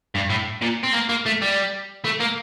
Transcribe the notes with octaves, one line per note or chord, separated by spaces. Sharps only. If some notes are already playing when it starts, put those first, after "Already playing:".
G2
A2
A#2
C4
A#3
A#3
A3
G3
A3
A#3